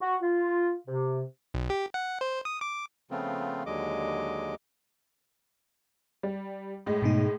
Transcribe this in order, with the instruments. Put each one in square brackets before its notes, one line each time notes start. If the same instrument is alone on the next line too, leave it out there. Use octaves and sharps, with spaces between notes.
[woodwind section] F#4
F4
C3
[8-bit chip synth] B1
G4
F#5
C5
D#6
D6
[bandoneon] C#3 F3 A3 B3 C4 F4
D#2 D3 F#3 G#3 D#5 D6
[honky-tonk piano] G3
A2 G#3
[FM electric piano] G#2 B2 D#4